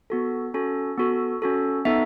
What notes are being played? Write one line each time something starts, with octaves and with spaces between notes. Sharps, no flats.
B3 F#4 A4
C#4 F#4 A4
B3 F#4 A4
C#4 F#4 A4
B3 D#4 A4 E5